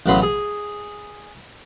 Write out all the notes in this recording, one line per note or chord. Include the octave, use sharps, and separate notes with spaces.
A1 C#3 F#3 B3 B4 C6
G#4